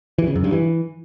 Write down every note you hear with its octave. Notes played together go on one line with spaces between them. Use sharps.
E3
C#3
F#2
G2
E3